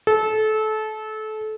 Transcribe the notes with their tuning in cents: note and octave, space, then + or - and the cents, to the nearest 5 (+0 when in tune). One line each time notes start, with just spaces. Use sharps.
A4 -25